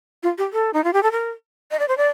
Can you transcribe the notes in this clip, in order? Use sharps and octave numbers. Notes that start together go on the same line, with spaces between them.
F4
G4
A4
D#4
F4
G4
A4
A#4
D#5
D5
C5
D5